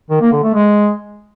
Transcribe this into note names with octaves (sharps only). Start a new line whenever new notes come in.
D#3
A#3
D3
A3
G#3